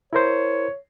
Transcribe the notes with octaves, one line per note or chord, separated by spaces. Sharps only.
E4 A#4 C5 C#5